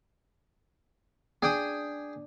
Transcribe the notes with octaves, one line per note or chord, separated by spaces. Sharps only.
D4 G#4 G5 D#6